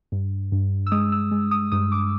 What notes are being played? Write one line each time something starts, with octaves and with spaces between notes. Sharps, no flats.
G2
G2
E6
G#3 D#6
E6
G#3
D#6
G2 D#6
D6